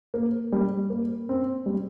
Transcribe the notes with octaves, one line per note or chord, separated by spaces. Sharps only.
A#3
G3
A#3
C4
G3